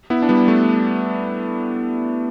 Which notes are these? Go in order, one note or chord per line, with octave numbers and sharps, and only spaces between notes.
B3 E4
D4
G3 B3
A3